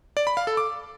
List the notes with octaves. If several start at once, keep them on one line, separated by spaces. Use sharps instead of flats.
D5
B5
F5
A4
D6